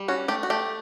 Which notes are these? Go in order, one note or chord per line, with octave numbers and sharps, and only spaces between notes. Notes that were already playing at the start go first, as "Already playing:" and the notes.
Already playing: G3
C#4 F#4
A3 G4
F#4
A3 G4